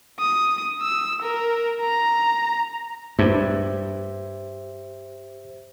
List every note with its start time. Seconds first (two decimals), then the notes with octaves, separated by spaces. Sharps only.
0.19 D#6
0.82 E6
1.22 A#4
1.81 A#5
3.19 G2 G4 C5 E5